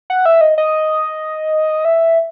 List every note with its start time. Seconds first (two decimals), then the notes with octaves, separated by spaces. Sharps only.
0.10 F#5
0.26 E5
0.41 D#5
0.58 D#5
1.85 E5